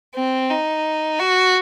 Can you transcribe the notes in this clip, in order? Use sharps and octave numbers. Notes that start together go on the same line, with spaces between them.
C4
D#4
F#4